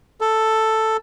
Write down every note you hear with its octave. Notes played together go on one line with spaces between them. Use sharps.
A4